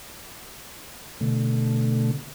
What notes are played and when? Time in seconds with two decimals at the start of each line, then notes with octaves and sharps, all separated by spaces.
1.20 B2 D3 A3